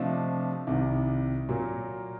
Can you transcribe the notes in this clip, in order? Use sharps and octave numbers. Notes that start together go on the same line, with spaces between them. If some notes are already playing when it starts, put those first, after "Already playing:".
Already playing: C3 F3 A3 D4 D#5 F5
C2 C3 D#3
A#2 F#3 A#3